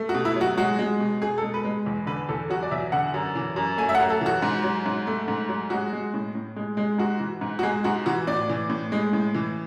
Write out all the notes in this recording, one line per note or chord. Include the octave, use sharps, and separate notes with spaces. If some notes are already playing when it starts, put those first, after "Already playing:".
Already playing: A3
F#4
B2
E4
F#3
F#4
G#3 F#4
G#3
B2
B2 G#4
A4
G#3
B4
G#3
E2
D3 B4
E2 A4
F#3 F#4
D5
E2 E5
D3 F#5
F#2
E3
F#2
A3 G#5
E5
F#5
F#2
A4
E3 F#4
G#2
F#3
G#2
A3
G#2
F#3
G#3 F#4
G#3
A2
A2
G#3
G#3
G#2 F#4
E3
G#2
F#4
G#3 G#4
G#2 F#4
E3 F#4
A2 D5
E3
A2
G#3
A2
E3